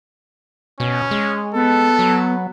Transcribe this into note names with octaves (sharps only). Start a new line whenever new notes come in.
B2 C#4
G#3
B3 A4
F#3